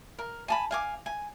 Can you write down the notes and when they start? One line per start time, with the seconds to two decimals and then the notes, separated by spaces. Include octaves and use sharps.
0.19 A#4
0.48 G#5 A5 B5
0.71 F5 G#5 D6
1.06 G#5